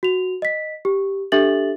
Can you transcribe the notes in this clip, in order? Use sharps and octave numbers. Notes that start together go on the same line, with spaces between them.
F#4 F7
D#5 B6
G4
D4 G4 A4 E5 A6 F#7